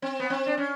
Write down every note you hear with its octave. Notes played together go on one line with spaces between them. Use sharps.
C4
B3
C4
D4
C#4